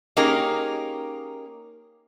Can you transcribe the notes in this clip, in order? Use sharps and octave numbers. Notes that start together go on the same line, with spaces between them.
A#3 C#4 D#4 G4 G#4 A#4